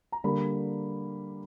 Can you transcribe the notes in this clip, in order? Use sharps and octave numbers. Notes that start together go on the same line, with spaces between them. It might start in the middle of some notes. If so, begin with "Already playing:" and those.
A#5
D3 G3 A#3 B5